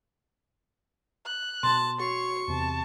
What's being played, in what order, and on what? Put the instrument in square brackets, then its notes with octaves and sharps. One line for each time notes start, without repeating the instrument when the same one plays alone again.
[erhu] F#6
[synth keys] B2 [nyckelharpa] A5 [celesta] C6
[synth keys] F#4 C7 [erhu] C#5 [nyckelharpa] C#6
[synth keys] E2 C3 [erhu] A5